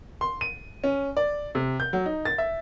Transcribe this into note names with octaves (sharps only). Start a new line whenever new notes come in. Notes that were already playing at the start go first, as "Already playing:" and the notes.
C6
D#7
C#4
D5
C3
G6
F#3
D#4
A6
E5